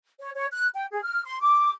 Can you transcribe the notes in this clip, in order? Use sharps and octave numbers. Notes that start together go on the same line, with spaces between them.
C#5
C#5
F#6
G5
G#4
F6
C6
D6